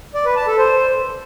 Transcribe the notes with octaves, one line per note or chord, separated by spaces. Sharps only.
D5
B4
A5
A4
C5